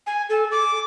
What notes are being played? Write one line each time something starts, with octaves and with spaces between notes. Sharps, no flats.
G#5
A4
D6